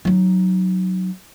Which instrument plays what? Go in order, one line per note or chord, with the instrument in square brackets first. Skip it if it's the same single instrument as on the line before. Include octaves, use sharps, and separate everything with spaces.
[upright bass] F#3 D#4